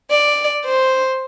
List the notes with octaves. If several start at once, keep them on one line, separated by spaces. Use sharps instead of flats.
D5
C5